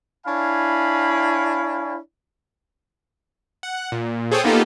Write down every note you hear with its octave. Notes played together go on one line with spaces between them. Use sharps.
D4 E4 C#5 F5 G#5 B5
F#5
A#2
G#4 A4 C5 C#5 G5 D#6
A#3 B3 D#4 F4 G4 A4